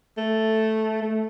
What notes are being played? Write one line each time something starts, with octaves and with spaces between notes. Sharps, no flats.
A3
A3